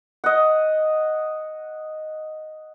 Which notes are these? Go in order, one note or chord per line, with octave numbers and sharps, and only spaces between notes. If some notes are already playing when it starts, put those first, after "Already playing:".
D#5 F#5